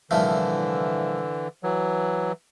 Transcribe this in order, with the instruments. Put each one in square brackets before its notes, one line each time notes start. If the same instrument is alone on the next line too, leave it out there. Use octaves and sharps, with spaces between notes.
[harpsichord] C2 A#2 F3 A3 [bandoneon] D3 E3
[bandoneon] E3 F#3